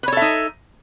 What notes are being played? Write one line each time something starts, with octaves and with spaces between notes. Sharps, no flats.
D#4 A4 B4 C#5 E5